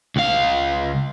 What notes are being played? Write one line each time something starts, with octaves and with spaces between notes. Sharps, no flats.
C#2 F5